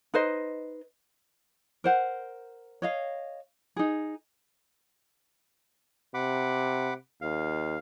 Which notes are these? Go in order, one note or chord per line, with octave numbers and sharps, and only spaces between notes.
D#4 B4 C5 D#5
A#4 C5 F#5
C#5 D#5 F5
D#4 G#4
C3 F#5 B5 D6
D#2 F5